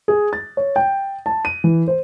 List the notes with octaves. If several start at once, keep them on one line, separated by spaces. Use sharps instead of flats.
G#4
A6
C#5
G5
A5
D#7
E3
C5